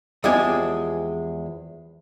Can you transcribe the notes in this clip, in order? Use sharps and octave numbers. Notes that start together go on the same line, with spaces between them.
E2 F3 G#3 C4 G4 G#5